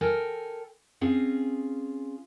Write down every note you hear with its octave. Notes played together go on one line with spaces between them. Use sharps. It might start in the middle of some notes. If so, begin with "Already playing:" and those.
A4 A#4 G5 G#5
C4 C#4 F4 G#4